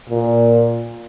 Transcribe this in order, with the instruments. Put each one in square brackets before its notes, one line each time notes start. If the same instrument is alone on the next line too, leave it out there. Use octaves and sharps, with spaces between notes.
[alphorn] A#2